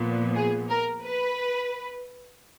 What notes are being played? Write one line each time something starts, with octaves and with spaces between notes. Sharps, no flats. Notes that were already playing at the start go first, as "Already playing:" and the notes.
Already playing: A#2 F3 B3
G#4
A#4
B4